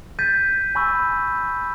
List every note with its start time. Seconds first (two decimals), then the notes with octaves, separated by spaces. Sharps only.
0.19 G6 A6 B6 D#7
0.75 G#5 B5 C#6 E6